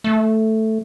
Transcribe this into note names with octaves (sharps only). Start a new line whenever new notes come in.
A3